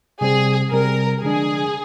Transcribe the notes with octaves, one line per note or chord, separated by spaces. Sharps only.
C3 G3 C4 G#4
C3 G3 C4 A#4
D3 F3 G#3 D4 G#4